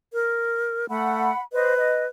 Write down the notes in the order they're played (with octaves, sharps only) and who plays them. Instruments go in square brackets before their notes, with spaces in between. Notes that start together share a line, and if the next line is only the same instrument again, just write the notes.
[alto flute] A#4
[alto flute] A3 [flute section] F#5 B5
[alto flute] B4 [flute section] C5 D#5
[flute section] D#5